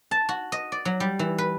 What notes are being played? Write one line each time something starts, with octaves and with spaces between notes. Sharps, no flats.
A5
F#4
D#5
D5
F#3
G3
E3
B4